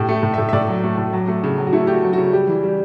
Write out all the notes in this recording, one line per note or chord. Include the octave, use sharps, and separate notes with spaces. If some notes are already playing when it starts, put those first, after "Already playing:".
Already playing: A2 G4
A3
A2
A2 E5
E5
A2 D5
F#3
A3
A2
F#3
A3
C#3
F#3
F#4
A3 E4
A3 G4
F#4
F#3
C#3 F#4
G3 G4
E3
G3